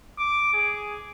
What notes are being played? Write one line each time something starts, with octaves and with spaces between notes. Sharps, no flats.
D6
G#4